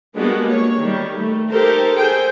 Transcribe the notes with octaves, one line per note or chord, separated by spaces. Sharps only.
G3 G#3 A#3 B3 D4 F#4
C#5
D#3 G3
A3
D#4 G4 A4 A#4 C5
G#4 A4 C5 G5 G#5